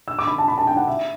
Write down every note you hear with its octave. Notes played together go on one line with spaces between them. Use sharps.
E6
D6
B5
A5
B5
A5
G5
F#5
E5